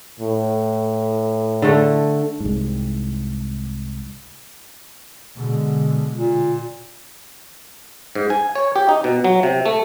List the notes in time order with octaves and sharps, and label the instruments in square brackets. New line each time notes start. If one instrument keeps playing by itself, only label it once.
[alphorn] A2
[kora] D3 A3
[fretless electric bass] C2 G#2
[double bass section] B2 D3 G#3
[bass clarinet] A#2
[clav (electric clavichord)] G#2
G#5
C#5
G4
D#4
B2
F#3
C3
A3